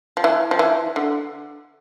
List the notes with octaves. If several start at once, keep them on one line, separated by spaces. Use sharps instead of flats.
F3
E3
F3
E3
D3